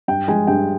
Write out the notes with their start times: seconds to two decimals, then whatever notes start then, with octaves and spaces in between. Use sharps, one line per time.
0.08 G2 G5
0.28 F3 G#3 G#5
0.47 G2 G5